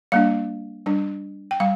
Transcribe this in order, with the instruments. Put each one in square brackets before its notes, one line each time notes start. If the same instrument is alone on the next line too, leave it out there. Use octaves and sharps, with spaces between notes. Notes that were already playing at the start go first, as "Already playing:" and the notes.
[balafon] G3 A#3 D4 F5
G3 D4
G5
G3 F5